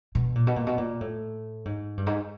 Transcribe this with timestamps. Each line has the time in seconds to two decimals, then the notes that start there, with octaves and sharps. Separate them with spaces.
0.15 B2
0.35 A#2
0.47 B2
0.56 A#2
0.67 B2
0.78 A#2
1.01 A2
1.65 G#2
1.97 G2
2.07 G#2